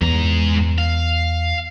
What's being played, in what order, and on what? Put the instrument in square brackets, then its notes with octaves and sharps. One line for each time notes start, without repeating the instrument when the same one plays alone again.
[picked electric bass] E2 [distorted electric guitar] G#2 A#5
[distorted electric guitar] F5